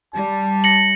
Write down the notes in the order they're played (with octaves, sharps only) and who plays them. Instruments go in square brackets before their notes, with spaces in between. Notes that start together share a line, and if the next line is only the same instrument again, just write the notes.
[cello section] G3 [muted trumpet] A5
[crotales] A#6 C#7 F#7